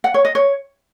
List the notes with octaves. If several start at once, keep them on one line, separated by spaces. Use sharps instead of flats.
F#5
C#5
D#5
C#5